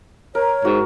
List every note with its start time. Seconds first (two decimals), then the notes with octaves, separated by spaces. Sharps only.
0.35 A#4 C#5
0.65 G#2 F#4